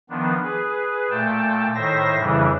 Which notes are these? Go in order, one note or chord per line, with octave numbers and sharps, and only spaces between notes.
D#3 F3 B3 D4
G#4 B4
A#2 A3 G5 A5
A2 D#3 C5 E5 A#6
F2 C#3 E3 G3 D4 E4